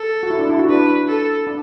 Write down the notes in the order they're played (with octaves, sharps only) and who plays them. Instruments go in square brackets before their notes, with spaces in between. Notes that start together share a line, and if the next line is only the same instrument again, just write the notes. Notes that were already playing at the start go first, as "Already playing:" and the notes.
Already playing: [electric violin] A4
[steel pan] F#4
E4
D4
E4
F#4
[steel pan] D4 [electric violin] B4
[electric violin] A4
[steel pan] D4